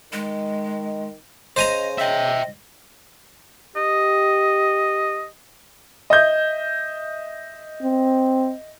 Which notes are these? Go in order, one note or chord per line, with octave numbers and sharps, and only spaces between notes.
D#3 G#3
C#3 C5 D#5 G#5 A#5
D#5 E5 G5
G4 D#5
D#5 E5 G6
C4